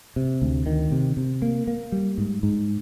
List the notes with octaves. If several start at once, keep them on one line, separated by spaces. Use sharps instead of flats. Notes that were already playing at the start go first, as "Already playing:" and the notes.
C3
D2
D#3
C3
C3
A#3
A#3
G3
G#2
G#2